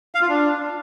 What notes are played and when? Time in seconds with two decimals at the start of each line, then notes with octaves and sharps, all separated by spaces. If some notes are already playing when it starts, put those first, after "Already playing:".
0.15 F5
0.22 F4
0.29 D4